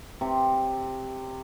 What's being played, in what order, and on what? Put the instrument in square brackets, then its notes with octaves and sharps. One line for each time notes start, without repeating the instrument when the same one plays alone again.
[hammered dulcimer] C3